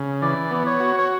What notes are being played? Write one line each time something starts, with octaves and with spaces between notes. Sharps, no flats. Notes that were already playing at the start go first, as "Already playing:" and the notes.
Already playing: C#3
E3 D5
B3 D5
C#5
F#4
C#5